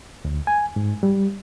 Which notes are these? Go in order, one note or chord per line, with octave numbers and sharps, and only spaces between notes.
D2
G#5
G#2
G3